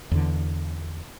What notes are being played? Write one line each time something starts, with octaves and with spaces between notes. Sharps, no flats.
E2 D3